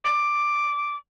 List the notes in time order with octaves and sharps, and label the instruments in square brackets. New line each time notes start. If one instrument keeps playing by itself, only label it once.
[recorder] D6